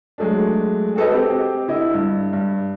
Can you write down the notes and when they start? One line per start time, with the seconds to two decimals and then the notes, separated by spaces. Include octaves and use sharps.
0.18 F#3 G#3 A3 D4
0.96 F#4 G#4 A4 B4 D#5
1.12 C4 G4
1.68 D3 E4 D#5
1.93 G2
2.33 G2